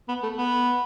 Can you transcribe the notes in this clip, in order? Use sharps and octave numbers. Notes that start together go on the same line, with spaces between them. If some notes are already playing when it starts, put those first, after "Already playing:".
B3
A3
B3